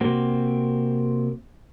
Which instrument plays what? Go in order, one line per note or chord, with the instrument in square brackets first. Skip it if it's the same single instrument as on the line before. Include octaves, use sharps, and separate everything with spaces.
[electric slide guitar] C3 A#3 C4 F#4